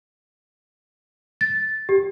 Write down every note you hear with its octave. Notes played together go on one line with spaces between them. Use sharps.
A6
G4